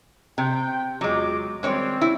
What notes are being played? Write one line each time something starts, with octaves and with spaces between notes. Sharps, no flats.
C3 G5
E2 F#3 G#3 F4 D6
D#3 G3 G#3 C4 C#5 D5
E4